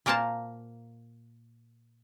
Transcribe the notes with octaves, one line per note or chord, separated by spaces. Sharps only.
A#2 A#3 A#4 C5 A5